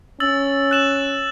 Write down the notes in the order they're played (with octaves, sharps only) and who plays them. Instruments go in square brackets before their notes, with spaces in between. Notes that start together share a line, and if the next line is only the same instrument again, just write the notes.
[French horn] C#4 [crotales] E6 A6 F#7
[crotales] F#6 E7 F#7